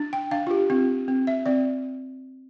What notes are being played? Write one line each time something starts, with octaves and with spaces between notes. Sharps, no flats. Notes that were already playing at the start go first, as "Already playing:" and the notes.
Already playing: D4
G5
D4 F5
F4
G4
C4 F4
C4
E5
C4 D5